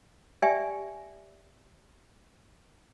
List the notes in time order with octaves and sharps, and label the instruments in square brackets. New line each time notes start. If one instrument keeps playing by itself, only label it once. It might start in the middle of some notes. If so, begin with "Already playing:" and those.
[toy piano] G4 D5 E5 G5 G#5